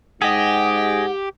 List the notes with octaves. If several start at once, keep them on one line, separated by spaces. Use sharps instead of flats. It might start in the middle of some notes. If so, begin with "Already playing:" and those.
G#2 G4 G#4 D#5 F#5